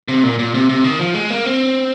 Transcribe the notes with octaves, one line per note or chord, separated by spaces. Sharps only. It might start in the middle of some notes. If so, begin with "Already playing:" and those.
C3
A#2
A#2
C3
C3
D#3
F3
G#3
A#3
C4